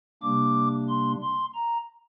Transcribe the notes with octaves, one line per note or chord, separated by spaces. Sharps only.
C3 G3 A#3 D4 D6
C6
C6
A#5